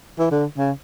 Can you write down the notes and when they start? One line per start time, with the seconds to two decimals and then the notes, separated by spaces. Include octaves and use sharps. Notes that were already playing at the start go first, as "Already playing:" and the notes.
0.19 E3
0.31 D3
0.57 C#3